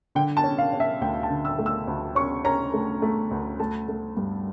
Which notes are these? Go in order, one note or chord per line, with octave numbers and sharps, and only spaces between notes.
D3 G5
A5
C#4
F5
C#4
E5
D2 G5
A5
D3
E6
A3
E6
D2
C#4 C#6
C#4 A#5
A3
A3
D2
A3 A5
A3
G2